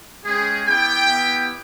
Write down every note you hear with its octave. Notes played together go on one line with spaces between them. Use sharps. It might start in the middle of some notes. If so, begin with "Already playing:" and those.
G#3 C#4 G4 G#4
B3 E4 G4 G5
B3 E4 G4